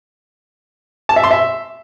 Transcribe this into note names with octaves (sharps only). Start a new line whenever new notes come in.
A5
E5
C6
E5